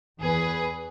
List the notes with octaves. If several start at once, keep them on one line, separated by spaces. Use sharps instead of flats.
E2 G#4 B4